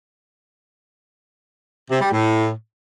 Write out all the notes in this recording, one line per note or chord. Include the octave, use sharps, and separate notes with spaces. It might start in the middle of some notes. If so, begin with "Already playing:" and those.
C3
G3
A2